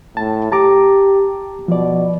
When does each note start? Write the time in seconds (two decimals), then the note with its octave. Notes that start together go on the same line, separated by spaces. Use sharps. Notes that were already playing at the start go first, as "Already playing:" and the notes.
0.17 A2 A5
0.52 G4 A5 A#5 D6
1.68 B2 F3 D5